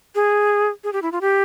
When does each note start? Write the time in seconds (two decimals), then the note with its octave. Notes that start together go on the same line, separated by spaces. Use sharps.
0.15 G#4
0.84 G#4
0.93 G4
1.02 E4
1.12 F4
1.21 G4